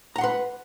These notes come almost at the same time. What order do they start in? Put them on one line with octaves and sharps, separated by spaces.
A#5 F#5 C6 B4